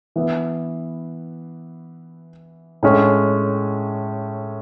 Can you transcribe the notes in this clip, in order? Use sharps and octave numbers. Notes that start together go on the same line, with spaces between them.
E3 B3 E4
A2 G#3 C#4